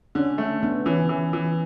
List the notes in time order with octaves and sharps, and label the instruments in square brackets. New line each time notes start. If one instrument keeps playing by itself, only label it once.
[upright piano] D3 [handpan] C#4
[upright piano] A3
[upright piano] D3 [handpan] B3
[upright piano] E3 [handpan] C#4
[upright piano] E3
E3